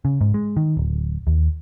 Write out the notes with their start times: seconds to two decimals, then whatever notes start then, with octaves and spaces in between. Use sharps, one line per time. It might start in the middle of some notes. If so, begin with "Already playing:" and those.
0.05 C#3
0.21 G#2
0.34 G#3
0.57 D#3
0.77 D1
1.27 D#2